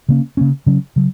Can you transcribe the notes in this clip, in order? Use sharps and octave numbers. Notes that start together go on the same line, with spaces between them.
C#3 A#3 C#4
C#3 A#3 C#4
C#3 F#3 C#4
C#3 F#3